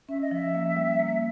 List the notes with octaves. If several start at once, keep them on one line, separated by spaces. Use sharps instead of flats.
C#4 E5
D#5
F3 E5
A#3
G3
A#3